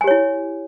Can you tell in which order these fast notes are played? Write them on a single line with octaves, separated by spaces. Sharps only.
G#5 G4 C#5 E4